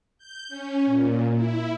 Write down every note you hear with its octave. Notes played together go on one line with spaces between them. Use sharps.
G6
C#4
A#2
E4